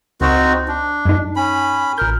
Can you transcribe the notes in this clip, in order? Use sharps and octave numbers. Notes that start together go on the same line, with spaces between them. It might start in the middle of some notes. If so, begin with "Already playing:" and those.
C#2 C4 D#4 F#4 C#6
D4
F#2 D#4
C#4 B5
A1 A#4 G6